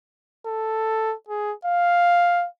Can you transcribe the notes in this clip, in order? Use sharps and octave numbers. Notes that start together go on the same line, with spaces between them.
A4
G#4
F5